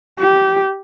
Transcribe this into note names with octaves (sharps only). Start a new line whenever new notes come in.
G4